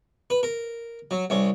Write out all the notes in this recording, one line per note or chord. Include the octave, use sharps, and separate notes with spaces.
B4
A#4
F#3
C2 C#4